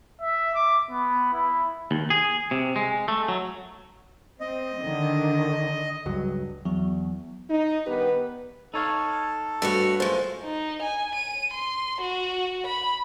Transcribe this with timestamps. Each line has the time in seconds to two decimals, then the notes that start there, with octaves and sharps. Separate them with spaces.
0.22 E5
0.55 D6
0.90 B3
1.33 E4
1.91 D#2
2.10 G#4
2.51 C3
2.76 G#3
3.08 A3
3.28 F#3
4.40 C4 D#5
4.81 D3 D#3
6.06 C#2 G2 F#3
6.65 E2 F#3
7.49 D#4
7.86 G2 D#3 B3 G4 B4
8.74 D#4 A4 C#5 F5
9.62 G2 A3 F#4 C#5
10.00 F#2 G#3 A3 F4 C5
10.44 D#4
10.82 G#5
11.15 D#7
11.54 C6
12.01 F#4
12.67 B5